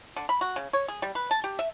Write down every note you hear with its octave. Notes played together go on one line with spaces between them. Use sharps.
D3
B5
F#4
C#3
C#5
G#4
G3
B4
A5
G4
E5